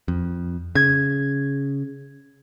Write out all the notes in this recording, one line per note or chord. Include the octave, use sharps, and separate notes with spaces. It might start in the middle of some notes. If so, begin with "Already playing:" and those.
F2
C#3 G#6